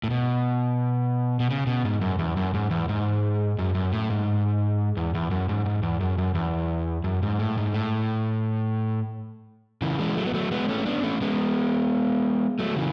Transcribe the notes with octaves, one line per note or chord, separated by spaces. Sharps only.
A2
B2
B2
C#3
B2
G#2
F#2
E2
F#2
G#2
E2
G#2
F#2
F#2
A2
G#2
E2
E2
F#2
G#2
G#2
E2
F#2
F#2
E2
F#2
G#2
A2
G#2
A2
C#3 E3
E3 G#3
F#3 A3
B3
F#3 A3
G#3 B3
A3 C#4
B3 D4
A3 C#4
G#3 B3
F#3 A3
C#3 E3